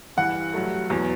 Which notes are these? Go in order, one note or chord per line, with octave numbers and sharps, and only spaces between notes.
G2 E3 G3 F#5
G2 F#3 A3
E2 B2 F#3